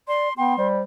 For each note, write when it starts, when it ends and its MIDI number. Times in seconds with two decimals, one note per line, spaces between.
0.08 0.29 74
0.08 0.34 84
0.37 0.55 59
0.37 0.54 79
0.37 0.67 84
0.58 0.81 55
0.58 0.82 72